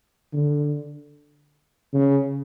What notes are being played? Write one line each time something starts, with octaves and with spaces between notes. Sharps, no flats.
D3
C#3